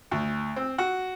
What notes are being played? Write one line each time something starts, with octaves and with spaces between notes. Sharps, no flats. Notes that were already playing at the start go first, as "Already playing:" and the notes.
D2
C4
F#4